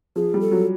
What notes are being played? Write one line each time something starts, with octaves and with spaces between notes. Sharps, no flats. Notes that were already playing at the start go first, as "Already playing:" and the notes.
F3 G#4
G3
A4
F#3